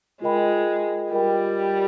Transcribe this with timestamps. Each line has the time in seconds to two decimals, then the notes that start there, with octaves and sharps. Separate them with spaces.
0.22 G#3 F4 A#4 D#5 G5 B5
1.12 G3 F4 A#4 D#5 G5 B5